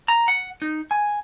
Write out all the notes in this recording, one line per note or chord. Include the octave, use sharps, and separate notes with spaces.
A#5
F#5
D#4
G#5